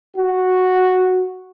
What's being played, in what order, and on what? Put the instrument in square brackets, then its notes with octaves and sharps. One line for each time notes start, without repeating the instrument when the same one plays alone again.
[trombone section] F#4